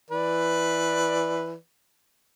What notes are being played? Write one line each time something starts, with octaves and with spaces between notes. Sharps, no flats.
E3 B4 D5